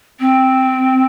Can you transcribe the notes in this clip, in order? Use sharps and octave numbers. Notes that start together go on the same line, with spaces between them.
C4